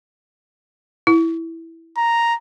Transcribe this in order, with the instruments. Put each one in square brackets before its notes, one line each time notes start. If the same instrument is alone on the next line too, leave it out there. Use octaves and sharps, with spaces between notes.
[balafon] E4
[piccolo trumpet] A#5